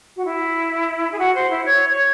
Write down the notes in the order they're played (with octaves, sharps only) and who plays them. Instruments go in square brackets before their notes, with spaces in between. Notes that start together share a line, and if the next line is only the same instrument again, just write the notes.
[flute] F#4
E4
G#4
F#4
C5
E4
C#5
C#5